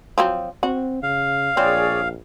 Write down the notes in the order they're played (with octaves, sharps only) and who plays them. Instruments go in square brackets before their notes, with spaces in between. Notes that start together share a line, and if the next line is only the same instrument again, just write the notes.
[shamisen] F3 F#3 C4
[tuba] C4 [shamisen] F#4
[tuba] C#3 [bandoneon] F5
[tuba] A#1 [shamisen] C4 [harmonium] G#4 C#5 D5